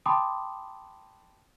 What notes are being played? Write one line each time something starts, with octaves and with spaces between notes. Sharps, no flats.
G5 A5 B5 C6 D6 D#6